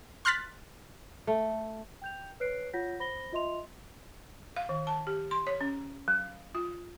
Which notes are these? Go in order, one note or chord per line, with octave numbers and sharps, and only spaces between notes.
C6 F6 F#6 A6 B6
A3
G5 G6 F7
B4 C#5 F#6 C7 D7
F4 C#5 F#5 G6 A#6 B6
C5 B5 A#6 G7
F4 D#5 E5 C6 F7
F5
D#3
A5
G4
C6
C#5
C#4
F#3
F4